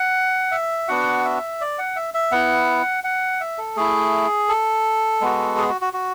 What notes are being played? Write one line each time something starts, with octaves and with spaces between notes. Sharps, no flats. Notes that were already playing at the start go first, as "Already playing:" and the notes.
Already playing: F#5
E5
B3 D4 F#4 F#5
E5
D5
F#5
E5
E5
B3 E4 F#5
F#5
E5
A4
A3 E4 G#4
A4
G#3 B3 F#4
G#4
F#4
F#4
F#4